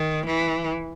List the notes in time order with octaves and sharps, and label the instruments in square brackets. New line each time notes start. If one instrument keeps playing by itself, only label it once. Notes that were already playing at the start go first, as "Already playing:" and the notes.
Already playing: [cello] D#3
E3